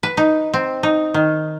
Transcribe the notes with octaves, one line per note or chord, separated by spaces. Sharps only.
B4
D#4
C4
D#4
D#3